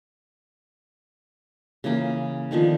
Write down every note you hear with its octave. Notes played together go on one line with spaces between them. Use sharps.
C#3 E3 A#3 A#4
D3 D#3 F3 B3